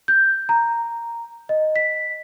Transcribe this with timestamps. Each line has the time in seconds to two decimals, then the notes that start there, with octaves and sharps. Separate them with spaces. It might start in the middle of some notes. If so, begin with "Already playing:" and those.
0.08 G6
0.49 A#5
1.49 D#5
1.76 B6